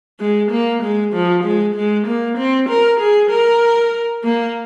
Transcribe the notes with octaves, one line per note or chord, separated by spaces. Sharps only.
G#3
A#3
G#3
F3
G#3
G#3
A#3
C4
A#4
G#4
A#4
A#3